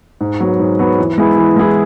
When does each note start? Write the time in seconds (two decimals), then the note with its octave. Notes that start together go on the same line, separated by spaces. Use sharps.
0.21 G#2
0.40 F#3 B3
0.60 G#2
0.79 F#3 B3
0.98 E3
1.18 G#3 B3 E4 G#4
1.38 E3
1.56 G#3 B3 E4 G#4